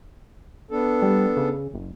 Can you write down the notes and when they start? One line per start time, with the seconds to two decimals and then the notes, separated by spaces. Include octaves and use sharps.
0.71 B3 D4 A4
1.02 G3
1.37 C#3
1.74 F#1